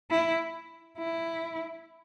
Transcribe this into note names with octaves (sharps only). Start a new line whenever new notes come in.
E4
E4